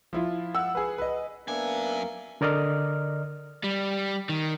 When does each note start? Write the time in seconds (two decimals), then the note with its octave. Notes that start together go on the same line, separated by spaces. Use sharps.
0.13 F3 E4 F4
0.54 F#5 E6
0.75 G#4 B4
0.98 B4 D#5
1.48 F#2 A#3 B3 D4 E5 G#5
2.41 D3 A#4 D5 D#5 F6
3.64 G3
4.29 D#3